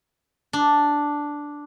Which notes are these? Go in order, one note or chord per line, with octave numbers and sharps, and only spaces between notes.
D4